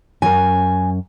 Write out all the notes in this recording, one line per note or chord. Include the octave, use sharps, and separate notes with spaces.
F#2 A#4 G#5